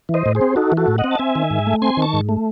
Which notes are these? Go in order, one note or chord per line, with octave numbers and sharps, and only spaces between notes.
E3
C5 D#5
A2
G#4 C5
C4
D#4 F#4 A4
E3
F#4 A4
A2
D#5 F#5
C4
A5
C4 E5 G#5
D#3
G#2
A3
C4 G#5 C6
D#3 A5 C#6
G#2
A3